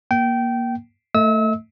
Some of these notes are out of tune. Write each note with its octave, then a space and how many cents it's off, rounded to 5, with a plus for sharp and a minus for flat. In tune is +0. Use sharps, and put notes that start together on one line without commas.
A#3 +20 G5 -20
A3 +20 D#5 +45 E6 -35